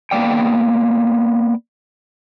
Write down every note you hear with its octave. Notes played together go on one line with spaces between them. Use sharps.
A#3 B3 D5 G5